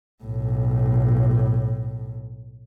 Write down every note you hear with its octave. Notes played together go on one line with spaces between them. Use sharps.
B1 A2